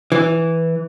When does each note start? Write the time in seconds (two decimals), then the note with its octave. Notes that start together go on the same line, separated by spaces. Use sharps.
0.12 E3